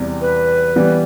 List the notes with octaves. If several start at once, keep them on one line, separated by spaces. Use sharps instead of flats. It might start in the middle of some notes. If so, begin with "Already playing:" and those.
Already playing: E2 C3 G3
B4
E3 G3 B3